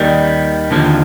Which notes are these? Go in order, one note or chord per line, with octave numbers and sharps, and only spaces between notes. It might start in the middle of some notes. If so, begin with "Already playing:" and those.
Already playing: D#2 D#3 G3
D#2 D3 F3